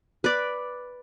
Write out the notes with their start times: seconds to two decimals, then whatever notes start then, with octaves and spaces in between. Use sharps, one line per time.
0.24 B4 D5